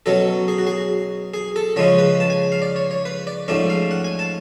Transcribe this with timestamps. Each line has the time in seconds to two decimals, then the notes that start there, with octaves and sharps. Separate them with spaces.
0.06 B2 F#3 C#4 A4
0.48 G#4
0.58 F#4
0.67 G#4
1.34 G#4
1.56 A4
1.76 C#3 F3 G#3 C#4 C#5
1.99 B4
2.20 A5
2.30 G#5
2.52 F5
2.62 D5
2.76 C#5
2.91 C#5
3.05 B4
3.27 D5
3.48 G#2 F3 A3 C#4 D5
3.70 F5
3.91 F#5
4.04 G#5
4.19 A5